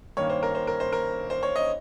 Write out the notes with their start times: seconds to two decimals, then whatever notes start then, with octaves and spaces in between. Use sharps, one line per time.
0.17 G2 D#3 A#3 C#4 C#5
0.29 C5
0.43 A#4
0.55 C5
0.67 A#4
0.80 C5
0.93 A#4
1.30 C5
1.43 C#5
1.56 D#5